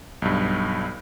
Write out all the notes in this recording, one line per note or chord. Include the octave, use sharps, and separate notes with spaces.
B1 G2